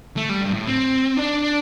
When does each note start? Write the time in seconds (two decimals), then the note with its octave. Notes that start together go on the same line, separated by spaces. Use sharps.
0.17 A3
0.29 G3
0.42 G2
0.54 A2
0.67 C4
1.17 D4